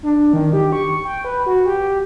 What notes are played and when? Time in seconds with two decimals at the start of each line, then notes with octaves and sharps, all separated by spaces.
0.03 D4
0.33 D#3
0.53 G4
0.72 C#6
1.05 G5
1.24 B4
1.46 F#4
1.66 G4